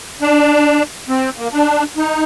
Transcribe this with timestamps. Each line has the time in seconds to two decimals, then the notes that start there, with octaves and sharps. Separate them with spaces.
0.21 D4
1.09 C4
1.38 A#3
1.53 D4
1.97 D#4